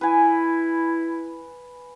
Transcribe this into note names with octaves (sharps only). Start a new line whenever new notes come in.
E4 B4 G#5